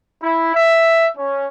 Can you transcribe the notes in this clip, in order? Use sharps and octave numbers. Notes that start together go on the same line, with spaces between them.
E4
E5
C#4